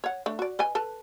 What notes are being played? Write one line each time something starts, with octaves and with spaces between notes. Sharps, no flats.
C#5 F#5
A3 D4
F#4 D5
B4 D#5 G#5
A4 B4 A5